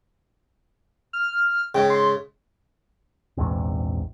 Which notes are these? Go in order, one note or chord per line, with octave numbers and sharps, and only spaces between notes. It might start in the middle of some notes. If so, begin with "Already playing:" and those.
F6
G#2 C#3 G5
C6
A#1 E2 G#2 C3